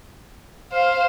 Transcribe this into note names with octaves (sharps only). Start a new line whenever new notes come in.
C5 F5